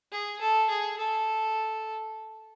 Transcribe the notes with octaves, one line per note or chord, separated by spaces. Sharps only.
G#4
A4
G#4
A4